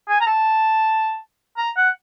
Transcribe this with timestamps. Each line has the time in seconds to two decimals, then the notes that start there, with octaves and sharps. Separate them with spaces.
0.08 G#5
0.21 A#5
0.27 A5
1.58 A#5
1.77 F#5